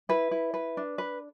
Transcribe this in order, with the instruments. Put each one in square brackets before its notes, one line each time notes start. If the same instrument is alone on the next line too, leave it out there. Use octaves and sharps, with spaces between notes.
[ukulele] E4 B4
E4
B4
D4
B4